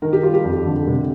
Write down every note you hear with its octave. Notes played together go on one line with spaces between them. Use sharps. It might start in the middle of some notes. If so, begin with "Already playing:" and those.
D#3 A#4
G4
G3 F4
G4
F2
D3
C3